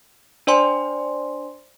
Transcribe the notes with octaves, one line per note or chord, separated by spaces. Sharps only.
D4 C5 D5 G#5 C6